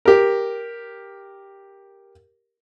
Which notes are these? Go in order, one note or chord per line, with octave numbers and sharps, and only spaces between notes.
G4 A#4